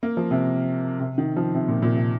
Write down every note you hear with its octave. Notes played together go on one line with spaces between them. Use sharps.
A#3
F3
C3
C3
D#3
F3
C3
A#2
A#2
C3